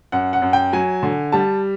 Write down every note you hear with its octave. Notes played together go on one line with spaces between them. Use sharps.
F#2 F#5
F#5
F#2
G5
F#3 G#5
D3
G3 A5